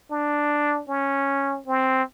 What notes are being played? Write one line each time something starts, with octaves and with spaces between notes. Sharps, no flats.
D4
C#4
C4